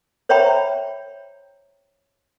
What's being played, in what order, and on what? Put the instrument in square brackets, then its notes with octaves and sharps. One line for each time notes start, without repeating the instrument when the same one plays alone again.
[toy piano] C5 C#5 E5 G5 A#5 B5